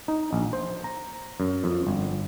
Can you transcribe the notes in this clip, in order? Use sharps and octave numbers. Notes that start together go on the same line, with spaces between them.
D#4
A#1
C5
A#5
F#2
F2
G1